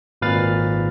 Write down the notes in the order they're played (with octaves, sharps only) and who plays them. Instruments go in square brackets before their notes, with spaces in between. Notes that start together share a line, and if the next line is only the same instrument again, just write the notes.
[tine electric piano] G#1 A#2 B4 F5 A6